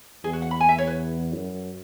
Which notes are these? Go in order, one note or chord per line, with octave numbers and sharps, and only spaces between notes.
E2 G#4
F#4
F#5
B5
G#5
E5
C#5
B4
F#2